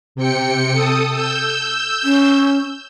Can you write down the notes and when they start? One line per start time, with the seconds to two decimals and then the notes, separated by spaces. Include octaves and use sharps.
0.15 C3 G5 C#7
0.72 A4 D#6
1.13 E6 G6
2.04 C#4